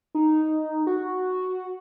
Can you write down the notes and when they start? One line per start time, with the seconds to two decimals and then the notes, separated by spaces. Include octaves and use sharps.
0.15 D#4
0.87 F#4